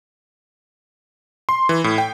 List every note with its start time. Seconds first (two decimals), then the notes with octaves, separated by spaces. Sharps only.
1.49 C6
1.69 E3
1.84 A2
1.98 G5